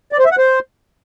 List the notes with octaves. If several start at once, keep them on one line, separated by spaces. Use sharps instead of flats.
D5
C5
E5
F#5
C5